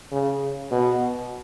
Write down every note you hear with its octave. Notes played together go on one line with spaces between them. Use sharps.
C#3
B2